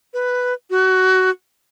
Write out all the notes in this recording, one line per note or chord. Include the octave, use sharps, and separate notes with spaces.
B4
F#4